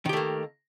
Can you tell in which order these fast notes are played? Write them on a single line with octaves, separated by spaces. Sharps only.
D#3 G4 A3 A#3